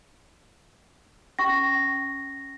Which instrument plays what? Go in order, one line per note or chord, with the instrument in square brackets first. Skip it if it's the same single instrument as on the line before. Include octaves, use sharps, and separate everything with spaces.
[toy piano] C#4 C#6 [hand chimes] A#6